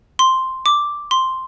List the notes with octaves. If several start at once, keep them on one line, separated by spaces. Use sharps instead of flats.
C6
D6
C6